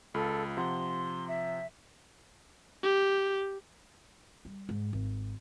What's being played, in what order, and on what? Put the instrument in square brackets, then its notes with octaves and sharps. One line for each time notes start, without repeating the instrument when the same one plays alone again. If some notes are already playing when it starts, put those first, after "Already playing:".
[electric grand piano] C#2 F4 B5 [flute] A4
[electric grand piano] C3 F3 F#5 [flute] C6
[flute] E5
[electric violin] G4
[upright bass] G3
G#2
G#1